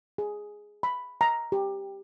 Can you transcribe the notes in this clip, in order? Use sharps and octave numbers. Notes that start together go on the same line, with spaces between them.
G#4
B5
A#5
G4